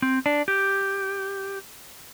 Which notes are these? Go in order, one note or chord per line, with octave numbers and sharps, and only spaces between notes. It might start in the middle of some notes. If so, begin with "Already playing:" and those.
C4
D4
G4